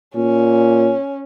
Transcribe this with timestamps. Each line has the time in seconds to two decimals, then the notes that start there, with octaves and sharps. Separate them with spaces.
0.16 A#2 C#4